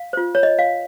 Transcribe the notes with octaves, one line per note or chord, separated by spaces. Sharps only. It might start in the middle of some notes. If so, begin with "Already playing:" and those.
Already playing: F5
F4 C5
C#5
D#5
F5